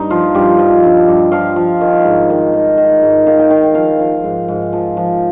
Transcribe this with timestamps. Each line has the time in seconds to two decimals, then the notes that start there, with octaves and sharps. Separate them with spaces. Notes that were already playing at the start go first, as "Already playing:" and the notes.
Already playing: G2 D#4
0.10 F3 F4
0.35 G2 G4
0.59 F3
0.83 G2
1.08 G2
1.32 F3 F5
1.56 F3
1.81 D#3
2.05 G#2
2.30 D#3
2.53 D#3
2.77 D#3
3.03 G#2
3.27 D#3 F5
3.39 G5
3.50 D#3 F5
3.63 F5
3.75 F3 F5
4.00 F3 F5
4.24 G#2
4.48 G#2
4.73 F3
4.97 F3